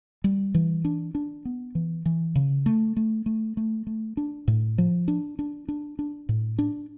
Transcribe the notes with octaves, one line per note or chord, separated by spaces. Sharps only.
G3
E3
D4
D4
B3
E3
E3
C#3
A3
A3
A3
A3
A3
D4
A2
F3
D4
D4
D4
D4
A2
D4